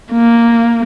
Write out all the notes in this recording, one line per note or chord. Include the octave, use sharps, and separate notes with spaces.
A#3